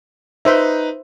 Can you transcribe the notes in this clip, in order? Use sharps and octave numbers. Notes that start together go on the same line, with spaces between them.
D#4 B4 C5 E5